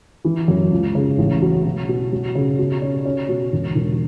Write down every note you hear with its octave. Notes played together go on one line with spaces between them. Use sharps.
E3
F#2
C#2
C#3
A1
F#3
B2
B2
F#3
C#3
B2
C#4
C#4
B2
E1
E1